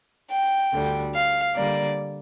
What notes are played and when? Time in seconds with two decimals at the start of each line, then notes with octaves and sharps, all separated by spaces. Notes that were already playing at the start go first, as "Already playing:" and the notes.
0.31 G5
0.73 D2 D3 G3
1.14 F5
1.55 D3 G3 A#3 D5